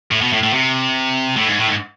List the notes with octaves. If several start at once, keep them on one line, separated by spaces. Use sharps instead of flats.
A2
B2
A2
A2
C3
A2
G#2
A2
G#2